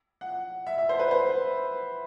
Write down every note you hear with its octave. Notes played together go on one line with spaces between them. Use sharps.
F#5
E5
E5
C5
B4
C5